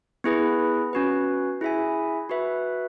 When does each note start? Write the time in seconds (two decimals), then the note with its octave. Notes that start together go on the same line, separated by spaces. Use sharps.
0.24 B3 E4 G#4 B4
0.93 C#4 F#4 B4
1.61 E4 G#4 E5 G#5
2.29 F#4 B4 E5